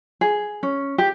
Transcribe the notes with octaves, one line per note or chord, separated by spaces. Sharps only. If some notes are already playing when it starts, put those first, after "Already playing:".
G#4
C#4
G4